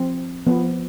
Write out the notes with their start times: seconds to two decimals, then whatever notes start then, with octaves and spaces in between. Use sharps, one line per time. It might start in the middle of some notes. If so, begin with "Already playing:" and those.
Already playing: F3 C4
0.46 F3 B3